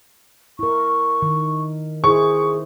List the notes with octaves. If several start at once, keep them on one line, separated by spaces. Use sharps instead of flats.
E4 A#4 C#6
D#3
E4 G#4 C5 C#6